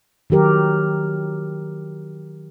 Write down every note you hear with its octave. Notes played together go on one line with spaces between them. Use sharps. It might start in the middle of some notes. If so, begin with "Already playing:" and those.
D#3 F#3 G4 A#4